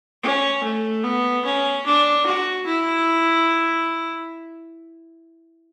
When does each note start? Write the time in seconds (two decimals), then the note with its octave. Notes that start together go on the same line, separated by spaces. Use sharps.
0.23 C#4
0.63 A3
1.03 B3
1.45 C#4
1.85 D4
2.26 F#4
2.66 E4